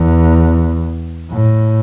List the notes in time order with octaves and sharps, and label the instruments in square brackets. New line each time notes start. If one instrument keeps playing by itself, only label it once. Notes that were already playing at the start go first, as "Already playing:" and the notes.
Already playing: [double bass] E2
A2